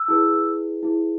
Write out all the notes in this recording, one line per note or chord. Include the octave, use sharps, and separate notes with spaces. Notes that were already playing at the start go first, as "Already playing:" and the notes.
Already playing: E6
E4 G#4 B4
E4 G#4 B4